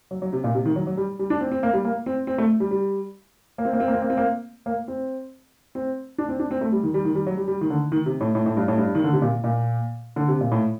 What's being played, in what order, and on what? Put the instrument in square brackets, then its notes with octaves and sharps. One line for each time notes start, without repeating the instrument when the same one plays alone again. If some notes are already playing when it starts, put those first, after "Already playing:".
[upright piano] F#3
F#3
C3
A#2
C3
D#3
F#3
F#3
G3
G3
D4
C4
C4
A#3
G3
A#3
C4
C4
A3
G3
G3
A#3
C4
A#3
C4
A#3
C4
A#3
C4
A#3
A#3
C4
C4
D4
C4
D4
C4
A3
G3
D#3
G3
D#3
G3
F#3
G3
G3
D#3
D3
D#3
C3
A2
A2
A2
G2
A2
G2
D#3
D3
C3
A#2
A#2
D3
C3
A#2
A2